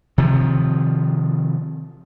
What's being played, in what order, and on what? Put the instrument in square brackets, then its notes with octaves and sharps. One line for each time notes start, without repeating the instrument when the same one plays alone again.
[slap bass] C3 D#3 F3